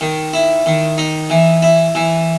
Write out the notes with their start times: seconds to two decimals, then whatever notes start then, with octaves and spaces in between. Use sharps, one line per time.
0.01 D#3
0.33 E4
0.66 D#3
0.98 D#4
1.30 E3
1.62 E4
1.95 E3